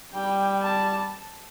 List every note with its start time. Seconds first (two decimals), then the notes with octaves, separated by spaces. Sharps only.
0.14 G3 G5
0.63 A5